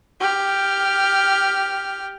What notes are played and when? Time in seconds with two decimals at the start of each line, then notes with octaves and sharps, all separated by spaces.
0.20 G4 F6